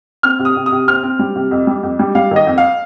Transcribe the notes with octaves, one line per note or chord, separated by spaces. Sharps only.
C4 F6
C3
D#6
C3
D#6
C3
C4 F6
C4
G3
C3
F2
G3
F2
G3
G3 F5
D#3 D#5
F2
F5